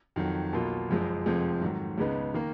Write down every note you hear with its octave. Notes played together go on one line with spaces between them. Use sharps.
F2 D#3 F#3
B1 B2 A#3 F4
F#1 F#2 F3 G#3
F1 F2 F3 G#3
G#2 D#3 F#3
C#2 C#3 G#3 B3 D#4
D#3 A#3